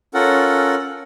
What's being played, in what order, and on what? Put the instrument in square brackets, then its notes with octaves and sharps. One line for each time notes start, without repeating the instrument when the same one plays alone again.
[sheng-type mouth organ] C#4 F4 A4 A#4 F#5